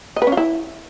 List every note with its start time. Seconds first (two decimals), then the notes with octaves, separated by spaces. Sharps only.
0.16 D#5
0.22 B4
0.27 C#4
0.32 F4
0.37 E4